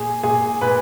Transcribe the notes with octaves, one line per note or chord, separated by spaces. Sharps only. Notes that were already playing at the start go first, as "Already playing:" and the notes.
Already playing: A#2 G#4
A#2 G#4
A#2 B4